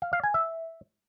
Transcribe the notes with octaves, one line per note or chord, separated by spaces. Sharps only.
F5
F5
G#5
E5